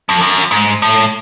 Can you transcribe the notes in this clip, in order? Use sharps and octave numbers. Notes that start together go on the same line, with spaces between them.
F2
F#2
G#2
A2